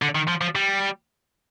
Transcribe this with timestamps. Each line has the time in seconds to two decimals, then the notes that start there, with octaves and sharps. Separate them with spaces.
0.02 D3
0.15 D#3
0.28 F3
0.41 F3
0.55 G3